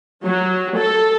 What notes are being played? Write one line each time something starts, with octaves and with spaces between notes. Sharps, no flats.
F#3
A4